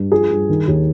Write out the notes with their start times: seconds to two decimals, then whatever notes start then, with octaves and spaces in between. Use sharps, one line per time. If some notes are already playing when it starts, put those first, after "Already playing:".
Already playing: G2
0.12 F3 G#4
0.31 G2
0.49 D#3
0.68 D#2